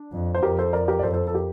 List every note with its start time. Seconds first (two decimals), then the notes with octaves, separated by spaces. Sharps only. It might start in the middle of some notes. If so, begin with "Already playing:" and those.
Already playing: D4
0.12 F2
0.35 C5
0.43 F2 G4 A#4
0.58 A4 C5
0.73 A#4 D5
0.88 G4 A#4
0.99 D5
1.03 F2 A4 C5
1.13 A4 C5
1.27 A4
1.35 G4 A#4